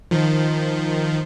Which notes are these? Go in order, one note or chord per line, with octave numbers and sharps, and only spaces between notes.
D#3 F3